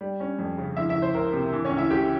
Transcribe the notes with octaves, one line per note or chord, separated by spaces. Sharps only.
G3
C#4
F2
C#3
F3 E4 E5
E4 E5
C#2
C5
C#2 A#4
C3
E3
C#4 C#5
C#2
E4 E5
C#2 G4 G5